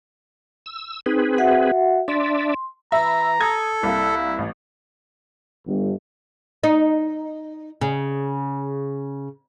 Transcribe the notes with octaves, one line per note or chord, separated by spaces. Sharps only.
E6
C4 D#4 G#4 B4
F#4 E5 F#5
D4 D5 E5 C6
E3 E5 A#5 B5
A4 D#6 G#6
C2 A#3 E4
A1
G1
D#4
C#3